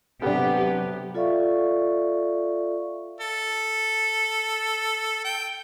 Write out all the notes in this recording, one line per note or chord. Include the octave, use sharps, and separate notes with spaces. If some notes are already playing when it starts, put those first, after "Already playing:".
C3 F#3 B3 D4 G4 A4
F4 A4 D5 E5 F5 C#6
A4
G5